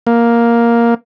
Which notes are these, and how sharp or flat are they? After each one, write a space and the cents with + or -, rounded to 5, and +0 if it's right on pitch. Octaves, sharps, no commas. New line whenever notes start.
A#3 +5